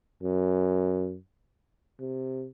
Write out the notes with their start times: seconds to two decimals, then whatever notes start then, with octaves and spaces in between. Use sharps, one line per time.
0.23 F#2
2.00 C3